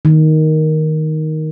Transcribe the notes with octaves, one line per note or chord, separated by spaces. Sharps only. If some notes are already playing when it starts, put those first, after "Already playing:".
D#3